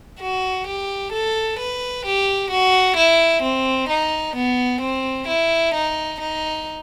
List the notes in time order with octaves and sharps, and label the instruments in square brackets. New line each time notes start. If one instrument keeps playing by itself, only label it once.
[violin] F#4
G4
A4
B4
G4
F#4
E4
C4
D#4
B3
C4
E4
D#4
D#4